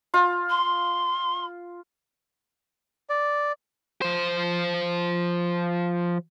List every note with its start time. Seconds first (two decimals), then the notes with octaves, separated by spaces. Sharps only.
0.14 F4
0.50 C6
3.09 D5
4.02 F3 C5